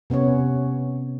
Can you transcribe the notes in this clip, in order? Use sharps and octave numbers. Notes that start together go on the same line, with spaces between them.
C3 B3 C#4 C#5